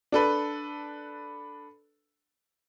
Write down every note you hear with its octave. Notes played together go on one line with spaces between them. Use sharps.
D4 A4 B4